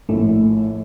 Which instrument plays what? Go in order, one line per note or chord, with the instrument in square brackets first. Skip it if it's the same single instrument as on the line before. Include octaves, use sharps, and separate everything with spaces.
[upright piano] A#1 A2 [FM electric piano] A3